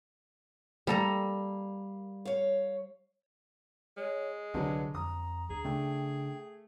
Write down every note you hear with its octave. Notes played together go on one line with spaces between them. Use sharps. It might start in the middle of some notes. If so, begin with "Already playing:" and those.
G3 A#3 A4 A#5
C#5 F5
G#3 C#5
C2 D3 F#3 B4
F2 A#5 D#6
D2 G#4
C#3 A3 D4 G5